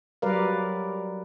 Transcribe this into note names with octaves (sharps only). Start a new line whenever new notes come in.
F#3 G3 A#4 B4 D5 F5